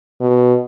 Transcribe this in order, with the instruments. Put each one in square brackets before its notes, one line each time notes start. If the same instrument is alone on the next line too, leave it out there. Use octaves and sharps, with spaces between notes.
[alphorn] B2